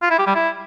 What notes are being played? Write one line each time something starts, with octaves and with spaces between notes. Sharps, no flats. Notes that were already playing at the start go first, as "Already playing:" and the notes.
F4
E4
G4
G3
E4